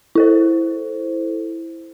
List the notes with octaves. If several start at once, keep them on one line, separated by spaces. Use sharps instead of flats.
E4 A4 C5